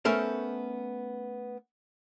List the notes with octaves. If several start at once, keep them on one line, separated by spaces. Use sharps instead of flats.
A3 B3 C#4 A4 A#4 C5